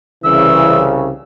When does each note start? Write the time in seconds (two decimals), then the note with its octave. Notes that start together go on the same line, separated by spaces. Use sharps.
0.24 C2 C#3 E3 E6